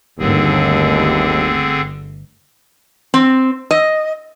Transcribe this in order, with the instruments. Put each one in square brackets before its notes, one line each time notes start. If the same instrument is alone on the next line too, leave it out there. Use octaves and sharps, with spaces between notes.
[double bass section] G1 A3 [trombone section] D#2 [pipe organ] D3 C4 G#4
[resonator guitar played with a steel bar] C4
D#5